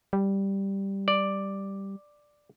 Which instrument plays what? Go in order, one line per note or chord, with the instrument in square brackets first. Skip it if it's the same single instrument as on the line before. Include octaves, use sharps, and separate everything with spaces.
[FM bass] G3
[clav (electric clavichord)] D5